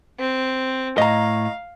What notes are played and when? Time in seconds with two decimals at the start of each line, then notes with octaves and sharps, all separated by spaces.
0.18 C4
0.98 A2 D#5 F5 A#5